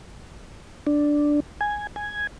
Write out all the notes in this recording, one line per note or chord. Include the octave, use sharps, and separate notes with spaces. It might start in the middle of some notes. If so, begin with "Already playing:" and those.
D4
G#5
G#5